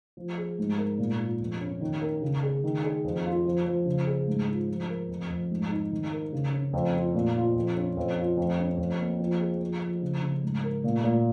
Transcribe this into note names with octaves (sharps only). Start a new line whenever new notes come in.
F3
G#4
G#2
A#4
A#2
F4
F2
C#4
D#3
A#4
C#3
G#4
D#3
G#4
F2
F4
F3
F3
C#3
G#4
G#2
F4
F3
A#4
F2
F2
G#2
D#4
D#3
A#4
C#3
C#4
F2
F4
A#2
F4
F2
C#4
F2
F4
F2
C#4
F2
A#3
F3
G#4
F3
F3
C#3
C#3
G#2
A#4
A#2
A#2